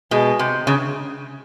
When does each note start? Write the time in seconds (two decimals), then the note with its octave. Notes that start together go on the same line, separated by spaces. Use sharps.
0.11 B2 G#3
0.39 C3
0.67 C#3